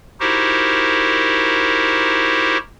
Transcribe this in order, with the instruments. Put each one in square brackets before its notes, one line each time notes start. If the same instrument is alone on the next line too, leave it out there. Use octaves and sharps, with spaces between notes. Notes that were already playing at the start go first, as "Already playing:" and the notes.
[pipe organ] D#4 E4 F#4 G4 A#4 C5